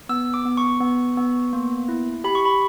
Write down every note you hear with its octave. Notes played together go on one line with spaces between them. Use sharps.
B3 E6
D6
B3
C#6
B3
B3
A#3
E4
G4 B5
C#6
B5